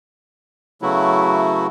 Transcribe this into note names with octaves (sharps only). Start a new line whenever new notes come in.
C#3 F#3 A3 B3 E4 F#4